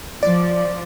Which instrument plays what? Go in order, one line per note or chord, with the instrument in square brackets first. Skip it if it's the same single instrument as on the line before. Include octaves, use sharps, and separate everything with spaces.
[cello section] F3 [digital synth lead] D5